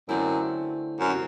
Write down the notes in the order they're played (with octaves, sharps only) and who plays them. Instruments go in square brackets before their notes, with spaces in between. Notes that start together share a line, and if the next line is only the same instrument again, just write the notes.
[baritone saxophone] F#2 [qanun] D3 A3 C4 E4
[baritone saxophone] F#2
[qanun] C3